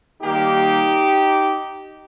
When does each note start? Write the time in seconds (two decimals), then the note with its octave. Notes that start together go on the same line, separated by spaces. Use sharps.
0.21 D#3 G3 A#3 D#4 G4